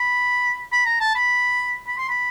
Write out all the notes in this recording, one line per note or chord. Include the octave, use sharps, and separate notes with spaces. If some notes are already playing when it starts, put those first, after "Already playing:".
Already playing: B5
B5
A#5
A5
B5
B5
C6
B5